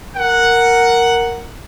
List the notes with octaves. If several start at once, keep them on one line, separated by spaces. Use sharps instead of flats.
A#4 F#5